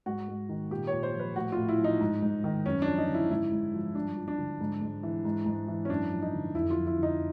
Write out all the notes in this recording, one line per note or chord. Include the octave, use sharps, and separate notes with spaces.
G#2 F#4
G#2
D#3
A#2 G4
A#2 C#5
C5
F3
B4
A2 F#4
A2 F4
E4
F3 D#4
G#2
G#2
D#3
F#2 C#4
F3 D4
D#4
D3
E4
G#2 E4
G#2
F3
G2 D4
F3
D4
D3
G#2
G#2
E3
G#2
G#2
E3
C#4
F#2 D4
F3
D#4
D3
F2 E4
F4
F3
E4
D3
D#4